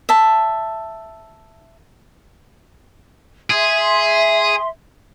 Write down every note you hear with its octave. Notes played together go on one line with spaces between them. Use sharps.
E5 A5
G#4 E5 C6